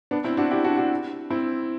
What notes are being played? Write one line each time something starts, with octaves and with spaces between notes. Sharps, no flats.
B3 D4
C4 E4
D4 F#4
E4 G4
D4 F#4
D4 F#4
C4 E4